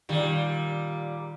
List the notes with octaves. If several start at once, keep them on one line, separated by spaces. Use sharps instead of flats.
A#2 D#3 G3 D#7